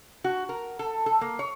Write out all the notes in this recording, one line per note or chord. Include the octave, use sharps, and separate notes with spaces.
F#4
A#4
A4
A4
A#3
C#5